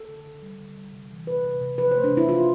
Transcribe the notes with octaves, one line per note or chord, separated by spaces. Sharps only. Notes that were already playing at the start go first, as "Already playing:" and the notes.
Already playing: A4
D3
D3
G3
D3
G3
C3
E3
C3 B4
C3
C3
F3 B4
C5
A3
D4
C3
E4
F3 F4